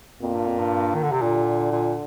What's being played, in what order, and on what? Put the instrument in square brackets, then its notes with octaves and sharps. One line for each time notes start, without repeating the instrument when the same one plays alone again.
[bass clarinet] F2 [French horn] A#2
[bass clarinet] G2
F2
G2
D#3
D3
C3
[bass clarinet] A#2 [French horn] D3
[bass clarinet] A#2